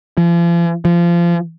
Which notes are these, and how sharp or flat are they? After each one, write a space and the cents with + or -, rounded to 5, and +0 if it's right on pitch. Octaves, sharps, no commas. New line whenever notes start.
F3 -40
F3 -25